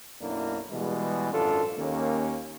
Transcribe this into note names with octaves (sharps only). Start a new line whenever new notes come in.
B1 F#2 A#3 D4 E4 A#4
B2 E3 G3 G#3
G#1 F#2 D4 F4 A4
D#2 A#3 C#4